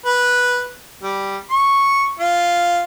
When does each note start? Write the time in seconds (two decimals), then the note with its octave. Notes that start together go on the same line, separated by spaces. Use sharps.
0.06 B4
1.03 G3
1.50 C#6
2.20 F4